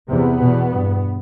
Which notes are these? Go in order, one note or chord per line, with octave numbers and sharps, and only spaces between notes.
E2 C3 B3
E2 B2
G2